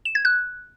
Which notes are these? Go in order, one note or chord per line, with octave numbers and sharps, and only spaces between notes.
E7
G#6
F#6